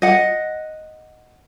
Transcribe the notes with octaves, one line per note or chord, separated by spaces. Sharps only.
D#5 F#5